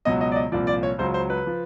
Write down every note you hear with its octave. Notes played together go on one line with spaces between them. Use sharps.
C#2 B2 F#3 D#5
D#5
D5
D#5
C2 A#2 F3 D5
D5
C#5
C#2 C#3 F#3 C5
C5
B4
F3